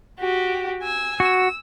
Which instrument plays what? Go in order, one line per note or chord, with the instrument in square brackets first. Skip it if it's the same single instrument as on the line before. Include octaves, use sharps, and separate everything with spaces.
[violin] F#4 G4
G#5 E6
[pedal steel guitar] F#4 [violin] E6